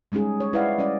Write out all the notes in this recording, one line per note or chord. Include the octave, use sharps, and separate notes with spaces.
G3 G#3 C#4 D#4 G#4
C#5
E4 B4 C5 D5 F5 F#5
G3 C#4 D5 D#5